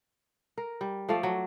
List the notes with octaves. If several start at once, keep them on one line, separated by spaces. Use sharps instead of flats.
A#4
G3
F3 A3 D5 F5
F#3